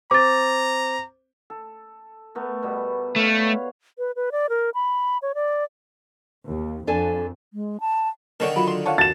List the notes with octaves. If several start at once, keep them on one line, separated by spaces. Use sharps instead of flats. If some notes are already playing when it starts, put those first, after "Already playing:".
C4 A#5 D6 A6
A4
A3 B3 A#4
B2 G3 B3
A3 B4 C#5 F5
B4
B4
D5
A#4
B5
C#5
D5
D#2
F2 D4 A4 G#5
G#3
A5
D3 D#3 A4 C#5 G5
F#3 F4 F#4 B5
C6
F4 C#5 D5 F5 F#5 A5
E2 F#4 A5 A6 E7